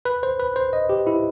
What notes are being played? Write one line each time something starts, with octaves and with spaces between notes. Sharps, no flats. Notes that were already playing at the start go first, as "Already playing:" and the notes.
B4
C5
B4
C5
D#5
G4
E4